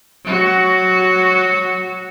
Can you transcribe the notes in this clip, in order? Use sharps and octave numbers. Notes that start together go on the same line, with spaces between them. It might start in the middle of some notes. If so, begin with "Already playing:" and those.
F#3 F#4